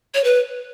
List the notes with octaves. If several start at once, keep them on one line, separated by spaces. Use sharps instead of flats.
C#5
B4